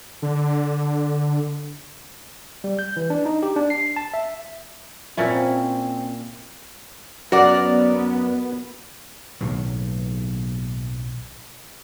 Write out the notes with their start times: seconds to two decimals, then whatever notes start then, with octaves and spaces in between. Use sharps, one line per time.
0.22 D3
2.64 G3
2.79 G6
2.96 E3
3.10 D4
3.26 D#4
3.43 G4
3.56 D4
3.70 C7
3.96 A5
4.14 E5
5.17 A#2 C4 C#4 E4
7.32 F#2 B3 F#4 A#4 D5
9.41 B1 A2 D#3 F#3